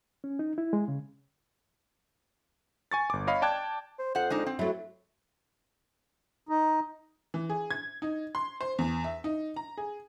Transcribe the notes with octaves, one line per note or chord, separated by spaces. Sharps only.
C#4
D#4
E4
G#3
C#3
G#5 C#6 A6
G1 D6
C#5 D#5 F5 B5
D5 G5 A5 D6 F#6 G#6
C5
F2 C5 F#5
G#3 D4 D#4
C4
F#3 A3 E4
D#4
E3
G#4
G#6
D#4
C6
C5
E2
E5
D#4
A#5
G#4